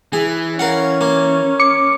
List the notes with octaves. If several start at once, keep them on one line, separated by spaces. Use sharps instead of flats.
E3 G#4
C#4 A#4 F5 F#5
A#3
D6 C#7